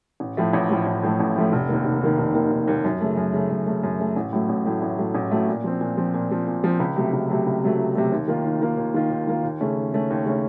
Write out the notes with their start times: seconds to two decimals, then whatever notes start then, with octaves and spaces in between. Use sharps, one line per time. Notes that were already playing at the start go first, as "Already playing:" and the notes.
0.20 A1
0.37 A2 F3 A3
0.53 A1
0.69 A2 F3 A3
0.86 A1
1.03 A2 F3 A3
1.20 A1
1.36 A2 F3 A3
1.52 F1
1.69 D#2 D#3 A#3
1.85 F1
2.01 D#2 D#3 A#3
2.18 F1
2.35 D#2 D#3 A#3
2.51 F1
2.67 D#2 D#3 A#3
2.84 F#2
3.01 C#3 A3
3.17 F#2
3.34 C#3 A3
3.50 F#2
3.67 C#3 A3
3.83 F#2
3.99 C#3 A3
4.16 A1
4.33 A2 F#3 A3
4.49 A1
4.66 A2 F#3 A3
4.82 A1
4.99 A2 F#3 A3
5.14 A1
5.32 A2 F#3 A3
5.48 A#2
5.64 F3 C4
5.81 A#2
5.97 F3 C4
6.14 A#2
6.31 F3 C4
6.47 A#2
6.64 F3 C4
6.80 C#2
6.96 C3 F#3 A3
7.13 C#2
7.30 C3 F#3 A3
7.46 C#2
7.62 C3 F#3 A3
7.79 C#2
7.95 C3 F#3 A3
8.12 D#2
8.28 D#3 A#3 F4
8.45 D#2
8.61 D#3 A#3 F4
8.77 D#2
8.94 D#3 A#3 F4
9.10 D#2
9.27 D#3 A#3 F4
9.43 D#2
9.61 C#3 A3 C#4
9.77 D#2
9.93 C#3 A3 C#4
10.10 D#2
10.26 C#3 A3 C#4